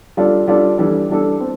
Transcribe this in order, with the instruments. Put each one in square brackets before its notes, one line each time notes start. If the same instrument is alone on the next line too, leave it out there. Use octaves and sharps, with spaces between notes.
[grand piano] G3 D4 F4 A4 D5
G3 D4 F4 A4 D5
E3 G3 D4 A4
E3 G3 D4 A4
C4